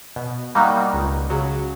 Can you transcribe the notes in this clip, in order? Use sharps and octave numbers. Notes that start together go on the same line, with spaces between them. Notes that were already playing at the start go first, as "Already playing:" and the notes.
B2
G3 A#3 D#4 F#4
C#2
C#3 F#3